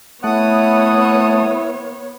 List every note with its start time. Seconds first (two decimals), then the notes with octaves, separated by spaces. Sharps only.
0.24 A3 B3 E4 C#5 F#5 D#6